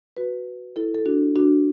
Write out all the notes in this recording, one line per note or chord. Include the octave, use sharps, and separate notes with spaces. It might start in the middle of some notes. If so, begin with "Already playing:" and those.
F#4 B4
E4 A4
A4
D4 F#4
D4 F#4